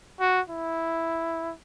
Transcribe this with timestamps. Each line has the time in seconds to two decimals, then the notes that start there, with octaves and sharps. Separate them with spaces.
0.20 F#4
0.50 E4